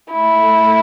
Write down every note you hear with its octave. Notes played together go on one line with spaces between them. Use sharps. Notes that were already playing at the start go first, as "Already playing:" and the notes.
A3 E4